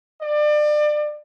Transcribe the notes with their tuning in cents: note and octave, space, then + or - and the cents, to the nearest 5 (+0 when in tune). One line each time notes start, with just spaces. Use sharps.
D5 +30